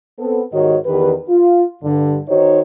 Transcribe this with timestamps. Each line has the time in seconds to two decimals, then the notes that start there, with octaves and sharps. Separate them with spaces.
0.18 B3 C4 A4
0.52 G#2 D#3 F#4 G4 C#5 D#5
0.86 E2 D#3 G4 B4
1.29 F4
1.84 G2 D3
2.29 D#3 D#4 F#4 C5 C#5